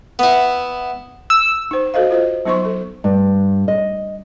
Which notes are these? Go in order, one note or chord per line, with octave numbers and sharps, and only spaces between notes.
B3 E4
E6
D#4 C5
F#4 A4 C5 D#5 F5
F4 C5 D#5
F#3 B3 D#4 C5 C6 C#6
A4
G2
D#5